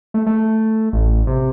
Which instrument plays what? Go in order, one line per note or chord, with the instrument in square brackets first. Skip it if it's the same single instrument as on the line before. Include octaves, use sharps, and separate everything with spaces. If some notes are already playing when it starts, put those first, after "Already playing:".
[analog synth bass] A3
A3
A1
C3